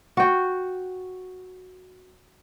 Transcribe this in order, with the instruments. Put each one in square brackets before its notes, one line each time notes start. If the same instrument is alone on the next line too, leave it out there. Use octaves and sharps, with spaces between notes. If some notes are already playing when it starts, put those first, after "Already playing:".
[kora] F#4 G5